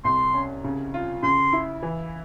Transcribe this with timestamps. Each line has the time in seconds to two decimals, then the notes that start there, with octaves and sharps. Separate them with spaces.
0.04 C2 C6
0.34 C#4
0.64 C#3
0.94 F4
1.23 C#3 C6
1.53 E4
1.83 E3